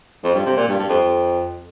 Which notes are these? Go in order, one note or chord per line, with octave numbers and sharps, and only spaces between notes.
F2
G2
C3
A#2
G2
G2
F2